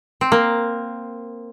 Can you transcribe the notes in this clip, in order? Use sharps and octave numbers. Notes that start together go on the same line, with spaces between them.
C4
A#3